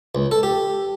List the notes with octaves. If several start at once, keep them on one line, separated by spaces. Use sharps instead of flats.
C#2
A4
G4